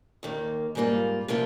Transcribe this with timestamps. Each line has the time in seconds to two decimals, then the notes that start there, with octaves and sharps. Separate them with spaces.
0.23 D#2 D#3 A#3
0.75 G#2 G3 A#3 F4
1.28 C3 F3 A#3 F4